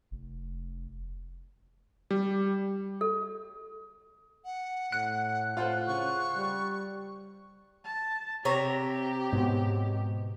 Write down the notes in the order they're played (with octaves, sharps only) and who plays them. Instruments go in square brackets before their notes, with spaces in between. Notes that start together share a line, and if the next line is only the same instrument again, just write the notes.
[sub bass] F1
[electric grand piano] G3
[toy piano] A4
[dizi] F#5
[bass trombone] A2 [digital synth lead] F#6 [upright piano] C#7
[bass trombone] A2 [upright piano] F4 C5 F#5
[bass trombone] C#3 [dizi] C#6
[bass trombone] G3
[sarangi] A5
[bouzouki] C3 C#5 A#5 [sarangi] G4
[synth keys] G#2 B2